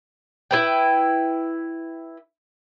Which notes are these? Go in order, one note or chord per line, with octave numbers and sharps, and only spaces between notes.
E4 B4 G5